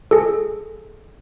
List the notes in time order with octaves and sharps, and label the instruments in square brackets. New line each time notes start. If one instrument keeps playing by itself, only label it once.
[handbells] G#4 A4